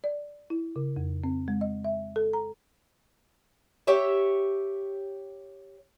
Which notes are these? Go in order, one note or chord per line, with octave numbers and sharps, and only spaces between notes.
D5
E4
C#3
F2
C4
G#3
D#5
E5
A4
A#5
G4 C#5 E5